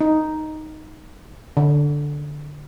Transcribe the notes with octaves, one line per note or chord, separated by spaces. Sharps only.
D#4
D3